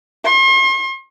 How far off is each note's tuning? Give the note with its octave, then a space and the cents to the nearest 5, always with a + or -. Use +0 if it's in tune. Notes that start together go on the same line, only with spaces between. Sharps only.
C6 +40